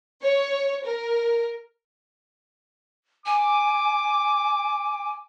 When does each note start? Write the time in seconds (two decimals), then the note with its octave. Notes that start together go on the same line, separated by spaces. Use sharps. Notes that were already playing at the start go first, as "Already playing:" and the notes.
0.22 C#5
0.85 A#4
3.26 G#5 D6